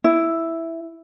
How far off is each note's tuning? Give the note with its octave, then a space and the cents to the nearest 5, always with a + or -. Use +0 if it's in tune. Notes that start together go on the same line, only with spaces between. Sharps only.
E4 +0